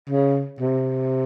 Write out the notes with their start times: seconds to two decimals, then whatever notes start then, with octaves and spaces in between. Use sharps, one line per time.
0.10 C#3
0.60 C3